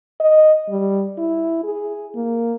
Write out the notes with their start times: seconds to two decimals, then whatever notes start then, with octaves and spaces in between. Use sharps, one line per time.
0.20 D#5
0.69 G3
1.18 E4
1.64 G#4
2.15 A#3